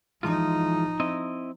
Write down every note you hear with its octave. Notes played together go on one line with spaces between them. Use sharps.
E3 F3 G#3 D#4 F4
C4 E4 D#5